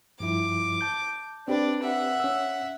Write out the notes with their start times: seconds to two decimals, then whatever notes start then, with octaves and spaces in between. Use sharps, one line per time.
0.20 G2 F3 E4 D6
0.81 A5 G6
1.48 C4 D4 G4 B4 D5
1.83 E5 F#5
2.20 C#4 E6